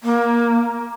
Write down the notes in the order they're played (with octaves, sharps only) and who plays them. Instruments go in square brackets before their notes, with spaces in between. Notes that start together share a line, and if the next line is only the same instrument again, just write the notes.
[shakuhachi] A#3